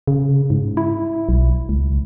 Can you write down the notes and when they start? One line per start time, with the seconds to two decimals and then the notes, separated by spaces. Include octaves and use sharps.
0.07 C#3
0.50 G#2
0.77 E4
1.29 B1
1.69 C#2